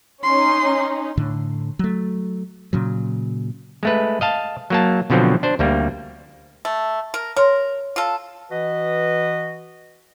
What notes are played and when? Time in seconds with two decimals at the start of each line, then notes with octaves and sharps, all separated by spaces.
0.23 C#4 D#4 C6
1.17 A2 D3
1.79 F#3 A3
2.73 A#2 C#3 F#3
3.83 G#3 A3 B4
4.21 D#5 F5 A5
4.70 F#3 A#3 A5
5.10 B2 D3 F3 F#3 C4
5.43 D4 C5
5.59 D2 G3 A#3
6.65 A3
7.14 A#4
7.37 A#4 C#5 C6
7.96 F4 A4
8.51 E3 F#4 B4 D#5